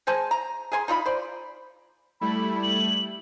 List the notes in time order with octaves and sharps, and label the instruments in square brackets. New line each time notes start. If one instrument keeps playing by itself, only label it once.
[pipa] G#3 C5 G#5 A5
A#5
G#4 A#4 G#5 C6
D#4 F4 D#5 B5
C5 D5
[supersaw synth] G3 A3 E4 [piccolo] B5
[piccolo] F#7